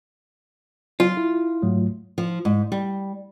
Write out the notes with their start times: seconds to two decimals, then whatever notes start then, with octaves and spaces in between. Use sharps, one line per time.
1.00 F#3 F4
1.17 E4
1.62 G#2 F#3 A3
2.18 F3
2.45 G#2
2.72 G3